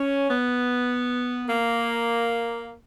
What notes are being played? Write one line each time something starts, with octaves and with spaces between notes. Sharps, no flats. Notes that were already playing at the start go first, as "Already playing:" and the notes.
Already playing: C#4
B3
A#3